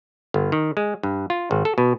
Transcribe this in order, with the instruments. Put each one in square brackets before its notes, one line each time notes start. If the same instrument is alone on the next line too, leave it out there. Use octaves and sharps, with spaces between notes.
[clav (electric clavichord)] G1
D#3
G#3
G2
F4
G#1
A4
B2